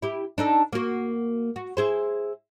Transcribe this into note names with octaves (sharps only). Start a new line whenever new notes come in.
E4 G4
D4 D#4 A4
A#3 F#4
F#4
E4 G#4 C5